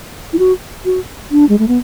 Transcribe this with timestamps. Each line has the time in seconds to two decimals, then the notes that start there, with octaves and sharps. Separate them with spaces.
0.33 E4
0.39 F#4
0.85 F#4
1.31 D4
1.49 G#3
1.59 A3
1.68 B3